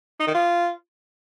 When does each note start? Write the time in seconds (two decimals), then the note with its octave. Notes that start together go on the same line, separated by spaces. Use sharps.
0.20 D#4
0.27 D#3
0.34 F4